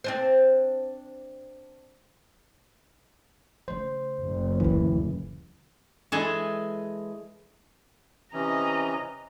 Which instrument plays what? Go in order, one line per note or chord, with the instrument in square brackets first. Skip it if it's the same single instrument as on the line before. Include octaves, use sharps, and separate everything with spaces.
[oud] C4 D4 C5
[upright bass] C#3 A3 [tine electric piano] C5
[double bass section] F#1
[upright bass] D#1 D2 [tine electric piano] E3
[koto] E3 G#3 G#4 A4
[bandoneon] C3 E3 C#4 [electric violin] D#5 A#5